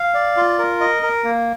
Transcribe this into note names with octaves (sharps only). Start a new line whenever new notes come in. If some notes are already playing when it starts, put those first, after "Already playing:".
Already playing: F5
D5
F4
A#4
D#5
A#4
A#3